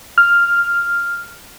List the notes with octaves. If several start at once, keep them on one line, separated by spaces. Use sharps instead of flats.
F6